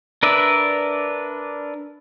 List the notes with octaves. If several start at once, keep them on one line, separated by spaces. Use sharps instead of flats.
D4 A#4 B4 D5 E5